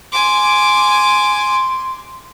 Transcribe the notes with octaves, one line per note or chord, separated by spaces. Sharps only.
G#5 C6 D6